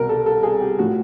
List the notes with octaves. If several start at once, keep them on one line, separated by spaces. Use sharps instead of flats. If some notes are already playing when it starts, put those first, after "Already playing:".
Already playing: C2 B2 A#4
A4
A4
G#4
G4
A2 F3 F#4